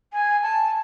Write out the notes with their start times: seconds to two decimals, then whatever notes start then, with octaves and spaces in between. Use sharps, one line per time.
0.13 G#5
0.43 A5